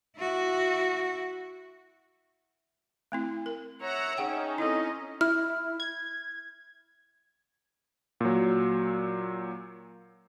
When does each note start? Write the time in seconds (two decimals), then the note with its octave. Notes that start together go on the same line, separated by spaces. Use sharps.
0.17 E4 F#4
3.12 A3 C4 E4
3.46 A#4
3.80 C#5 E5 F#5 A#5
4.18 C#4 D#4 G#4 F#5 G5
4.58 C4 E4 A4 D#5
5.21 E4 F6
5.80 G#6
8.21 A#2 F#3